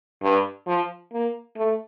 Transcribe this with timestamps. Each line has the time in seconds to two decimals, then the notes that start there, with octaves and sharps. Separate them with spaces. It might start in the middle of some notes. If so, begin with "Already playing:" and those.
0.23 G2
0.67 F3
1.13 A#3
1.57 A3